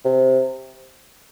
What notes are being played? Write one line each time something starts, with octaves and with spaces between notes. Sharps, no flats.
C3